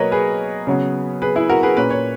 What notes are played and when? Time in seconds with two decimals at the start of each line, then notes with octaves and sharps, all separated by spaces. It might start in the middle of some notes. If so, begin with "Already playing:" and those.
Already playing: B2 F#3 A#3 A#4 B4 C#5 D#5
0.11 G#4 B4
0.67 C#3 F#3 B3
1.22 G#4 B4
1.35 E4 G#4
1.49 F#4 A#4
1.63 G#4 B4
1.77 A#2 A#3 C#4 B4
1.90 C#5